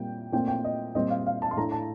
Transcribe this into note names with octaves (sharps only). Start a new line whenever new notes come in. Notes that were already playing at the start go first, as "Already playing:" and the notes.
Already playing: A#2 G3 C4 G5
A#2 A3 C4 G5
G5
D#5
A#2 G3 C4 D#5
F5
F5
A5
C6
A2 A3 D4 A#5
A5